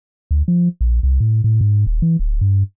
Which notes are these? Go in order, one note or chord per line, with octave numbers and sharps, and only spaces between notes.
D2
F3
A#1
C2
A2
A2
G#2
D#1
E3
D1
G2